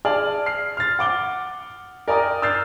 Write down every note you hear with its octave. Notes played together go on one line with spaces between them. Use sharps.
G#4 D5 A5 F6 F#7
F6 C7
F6 A6
F#5 D6 G7
A#4 D5 G5 G#5 A#5 D#6
E6 F6 G6 A6 C7